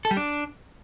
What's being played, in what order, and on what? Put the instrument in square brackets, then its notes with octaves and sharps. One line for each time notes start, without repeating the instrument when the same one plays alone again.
[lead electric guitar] A4
G3
D4